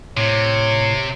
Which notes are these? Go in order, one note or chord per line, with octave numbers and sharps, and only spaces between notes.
A2 C3 C#5